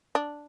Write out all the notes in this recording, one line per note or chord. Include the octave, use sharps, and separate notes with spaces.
D4